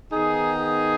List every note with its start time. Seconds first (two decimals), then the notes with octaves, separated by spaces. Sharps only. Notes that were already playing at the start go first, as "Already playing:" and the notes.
0.12 D#3 B3 D#4 G#4
0.58 G#4